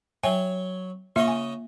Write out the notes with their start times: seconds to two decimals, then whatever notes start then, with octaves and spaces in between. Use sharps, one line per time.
0.23 F#3 C#5 E5 G5 G#5
1.16 C#3 A#3 F4 C#5 D#5 E5
1.28 G#5